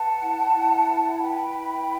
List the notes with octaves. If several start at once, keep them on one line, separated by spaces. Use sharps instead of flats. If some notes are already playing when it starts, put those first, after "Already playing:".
Already playing: B4 F#5 A5
E4
E4
B4
B4 G5 B5
E4